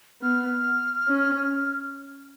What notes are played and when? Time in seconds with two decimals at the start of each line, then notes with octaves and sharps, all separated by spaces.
0.22 B3 F6
1.08 C#4